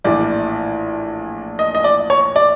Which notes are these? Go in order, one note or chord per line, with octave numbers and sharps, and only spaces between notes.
A#1 A2 E3 D5
D#5
D#5
D5
C#5
D5